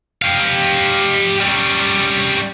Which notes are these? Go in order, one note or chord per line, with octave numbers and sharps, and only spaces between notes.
G4 F5
G3 C#4